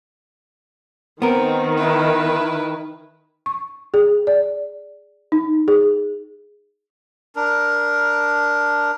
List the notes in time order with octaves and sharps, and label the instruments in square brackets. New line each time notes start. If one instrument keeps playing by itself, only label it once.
[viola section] D#3 [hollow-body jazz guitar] B3 A#4 [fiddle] C4
[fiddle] E4 B4
[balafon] C#6
G#4
D5
D#4
G#4
[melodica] D4 A#4